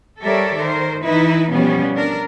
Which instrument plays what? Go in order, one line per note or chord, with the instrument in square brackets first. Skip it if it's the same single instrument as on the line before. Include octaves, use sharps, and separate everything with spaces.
[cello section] G3 A4 A#4 C#5 D5 E5
D#3 A#4 C5
E3 D#4 E4 B4
B2 F3 G3 B3 C#4
D4 A#4